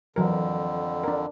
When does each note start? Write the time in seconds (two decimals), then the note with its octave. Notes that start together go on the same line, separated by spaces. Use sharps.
0.16 F2 D3 E3 F#3 A#4
1.04 D4 A#4